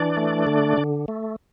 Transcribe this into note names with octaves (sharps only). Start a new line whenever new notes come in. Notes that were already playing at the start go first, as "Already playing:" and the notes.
Already playing: E3 D4 D5
A3
D3
D3
A3